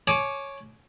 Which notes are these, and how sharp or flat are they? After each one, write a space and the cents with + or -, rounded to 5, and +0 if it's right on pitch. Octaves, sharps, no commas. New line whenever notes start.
C#5 -5 G#5 +40 D6 +0